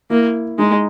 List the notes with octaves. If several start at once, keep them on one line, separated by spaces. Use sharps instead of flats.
A#3 E4
G#3 D#4